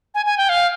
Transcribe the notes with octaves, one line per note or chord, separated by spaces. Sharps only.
G#5
G#5
G5
F5